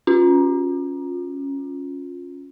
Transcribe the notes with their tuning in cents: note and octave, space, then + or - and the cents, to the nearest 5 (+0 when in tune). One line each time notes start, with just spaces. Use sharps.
C#4 +0 F4 +20